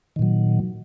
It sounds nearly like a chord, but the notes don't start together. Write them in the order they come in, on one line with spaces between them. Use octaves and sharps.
D#3 A#2 F#3